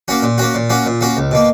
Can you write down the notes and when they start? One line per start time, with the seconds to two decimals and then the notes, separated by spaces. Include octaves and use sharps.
0.08 A#3 C#4 F#4
0.22 A#2
0.38 A#3 C#4 F#4
0.55 A#2
0.70 A#3 C#4 F#4
0.86 A#2
1.01 A#3 C#4 F#4
1.17 C#2
1.31 B2 A#3